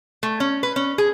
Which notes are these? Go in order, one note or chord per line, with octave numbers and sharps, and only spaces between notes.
A3
C#4
B4
C#4
G#4